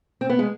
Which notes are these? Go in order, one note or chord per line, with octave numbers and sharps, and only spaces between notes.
C4
B3
G#3